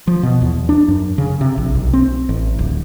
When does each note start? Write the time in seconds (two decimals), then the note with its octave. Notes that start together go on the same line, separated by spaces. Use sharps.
0.07 F3
0.23 B2
0.42 E2
0.69 D4
0.88 F#2
1.18 C#3
1.41 C3
1.58 A#1
1.75 B1
1.93 C4
2.29 A1
2.59 D1